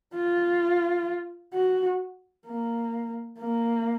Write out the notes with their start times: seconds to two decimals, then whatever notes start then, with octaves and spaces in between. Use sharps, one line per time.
0.15 F4
1.54 F#4
2.47 A#3
3.40 A#3